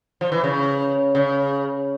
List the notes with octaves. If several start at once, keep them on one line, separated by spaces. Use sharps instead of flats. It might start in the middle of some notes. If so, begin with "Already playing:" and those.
F3
E3
C#3
C#3